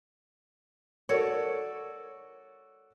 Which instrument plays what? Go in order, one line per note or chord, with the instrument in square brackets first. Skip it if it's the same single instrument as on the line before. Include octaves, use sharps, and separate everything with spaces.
[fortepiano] F#4 A4 D5 [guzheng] C#5